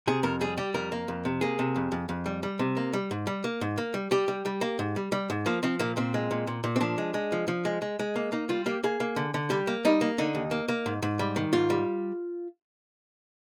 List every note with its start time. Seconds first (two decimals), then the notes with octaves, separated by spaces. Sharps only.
0.07 C3 G#4
0.23 F2 A#4
0.41 G3 G#4
0.57 G3 G4
0.74 F2 A#4
0.92 A#3
1.08 F2
1.25 C3
1.41 A#3 G#4
1.59 C3
1.76 F2
1.92 F2
2.09 F2
2.26 G3
2.43 G3
2.59 C3
2.77 A#3
2.93 G3
3.11 G#2
3.27 G3
3.44 A#3
3.61 G#2
3.78 A#3
3.94 G3
4.11 G3 G4
4.28 G3
4.45 G3
4.61 A#3
4.79 G#2
4.96 G3
5.12 G3
5.30 G#2
5.46 F3 A#3
5.63 F3 C4
5.79 A#2 A#3
5.97 A#2 C4
6.14 G#3
6.31 A#2
6.47 A#2
6.64 A#2
6.76 C4
6.81 F3 D4
6.98 G#3
7.14 G#3
7.32 F3
7.48 F3
7.65 G#3
7.82 G#3
7.99 G#3
8.16 A#3
8.32 A#3 D#4
8.49 G3 F4
8.66 A#3 G4
8.83 A#3 G#4
9.00 A#3
9.16 D3
9.34 D3
9.50 G3 G4
9.67 A#3
9.85 G3 D#4
10.01 A#3
10.18 D3 D#4
10.35 D#2
10.51 A#3
10.68 A#3
10.86 G#2
11.02 G#2
11.19 G3
11.36 D#3
11.53 G#2 F4
11.70 G3